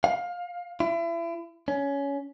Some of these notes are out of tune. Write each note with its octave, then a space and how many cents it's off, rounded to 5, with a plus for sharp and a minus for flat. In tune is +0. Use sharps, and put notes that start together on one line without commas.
F5 +20
E4 +35
C#4 +15